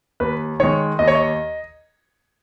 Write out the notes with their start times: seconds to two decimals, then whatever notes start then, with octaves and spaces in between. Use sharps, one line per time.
0.20 D#2 B4
0.60 D#3 G#3 C#5
0.99 D#2 D#5
1.08 C#5
1.15 D#5